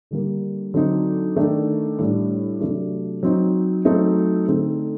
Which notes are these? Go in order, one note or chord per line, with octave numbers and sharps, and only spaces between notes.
D3 G3 A#3
D3 F#3 C4 D#4
D#3 A3 D4
A2 G3 D4
C3 F#3 A3 D4
F#3 C4 D#4
F#3 A3 C4 D#4
D3 A3 C4 D#4